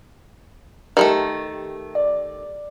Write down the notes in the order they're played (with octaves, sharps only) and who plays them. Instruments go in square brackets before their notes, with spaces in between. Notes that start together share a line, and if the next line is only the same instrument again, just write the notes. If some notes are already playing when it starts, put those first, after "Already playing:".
[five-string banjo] D#3 G#3 A3 [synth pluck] G4 A#4
[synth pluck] D5